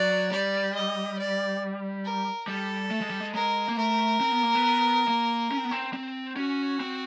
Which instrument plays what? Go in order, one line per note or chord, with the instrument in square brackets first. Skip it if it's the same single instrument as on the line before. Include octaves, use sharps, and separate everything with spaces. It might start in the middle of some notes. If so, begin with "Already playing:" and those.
Already playing: [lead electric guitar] F#3 [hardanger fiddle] D5
[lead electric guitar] G3 [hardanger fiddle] D5
[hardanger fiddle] D#5
D5
A#4
[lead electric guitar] G3 [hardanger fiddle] A4
[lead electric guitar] A3
G#3
G3
G#3
[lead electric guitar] G#3 [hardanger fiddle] A#4
[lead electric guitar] A#3
[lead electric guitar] A3 [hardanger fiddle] A#4
[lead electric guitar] C4
B3
A#3
B3
A#3
C#4
C4
B3
C4
C4
[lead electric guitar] C#4 [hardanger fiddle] F#4
[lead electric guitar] C4